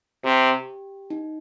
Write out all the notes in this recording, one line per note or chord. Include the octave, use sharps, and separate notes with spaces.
C3 G4
D#4